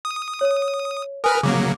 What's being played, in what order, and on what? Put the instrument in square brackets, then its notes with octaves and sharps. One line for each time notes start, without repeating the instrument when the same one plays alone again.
[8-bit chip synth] D#6
[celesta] C#5
[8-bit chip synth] A#4 B4 F6 [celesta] G#5 D#6
[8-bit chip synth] C#3 F#3 A#3 [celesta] D6